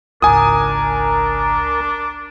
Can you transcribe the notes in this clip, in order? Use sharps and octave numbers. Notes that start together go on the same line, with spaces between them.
G#1 C#2 D4 A#4 G#5 D#6